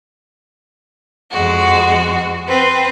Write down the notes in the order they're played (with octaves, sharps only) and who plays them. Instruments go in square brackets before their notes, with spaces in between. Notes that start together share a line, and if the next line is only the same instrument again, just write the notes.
[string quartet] F2 G#3 F#4
C4 B4